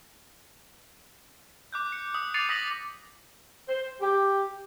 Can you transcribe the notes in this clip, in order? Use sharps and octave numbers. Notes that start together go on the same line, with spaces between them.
D6 F#6 G6
C#7
D#6
D6 A6 C7 C#7 D#7 F7
D#6 A#6 B6 C#7 F7 F#7
C5
G4